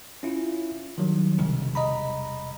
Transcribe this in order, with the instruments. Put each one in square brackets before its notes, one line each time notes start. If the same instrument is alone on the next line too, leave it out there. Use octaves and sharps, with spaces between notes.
[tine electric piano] C#4 E4 F4
D#3 F#3 G3
[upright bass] E1 C2 [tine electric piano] C#3
[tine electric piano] D#5 A#5 B5